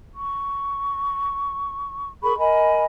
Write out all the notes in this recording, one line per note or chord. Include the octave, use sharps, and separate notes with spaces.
C#6
G#4 A#4 B5 C#6
A#4 D#5 G#5 B5